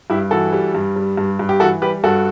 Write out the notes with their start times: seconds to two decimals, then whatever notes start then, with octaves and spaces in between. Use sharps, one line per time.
0.10 G2 E4 G4
0.31 E3 F#4 A4
0.53 G3
0.75 G2
0.96 G3
1.17 G2
1.39 G2
1.49 G4
1.60 E3 F#4 A4
1.82 G3 G4 B4
2.04 G2 F#4 A4